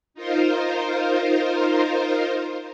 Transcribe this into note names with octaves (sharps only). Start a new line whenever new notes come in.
D#4 F4 A#4 C5